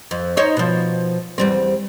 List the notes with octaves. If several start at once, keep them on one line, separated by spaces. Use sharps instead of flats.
F2
D#4 C5 C#5
B2 F3
E2 G3 C4